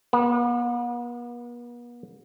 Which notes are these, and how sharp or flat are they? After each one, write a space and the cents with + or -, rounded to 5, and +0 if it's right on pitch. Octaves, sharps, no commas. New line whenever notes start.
B3 -45